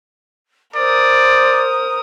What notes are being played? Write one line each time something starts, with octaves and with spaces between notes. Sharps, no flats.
A#4 C5 D5 D#6